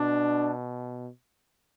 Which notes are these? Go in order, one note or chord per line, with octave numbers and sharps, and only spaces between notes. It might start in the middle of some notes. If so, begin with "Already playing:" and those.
Already playing: B2 D4